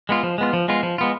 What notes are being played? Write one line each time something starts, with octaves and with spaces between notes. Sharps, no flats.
G#3 B3 F4
F3
G#3 B3 F4
F3
G#3 B3 F4
F3
G#3 B3 F4